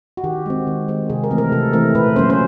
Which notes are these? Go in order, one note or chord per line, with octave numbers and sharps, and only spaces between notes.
F#4
D#3 G4
G#3 C4
D#3
G#3 C4
C3 G#4
A#4
E3 A3 C4
A#4
C3 A4
E3 A3 C4 A#4
A#2 B4
F#3 A#3 C#4 C5
C5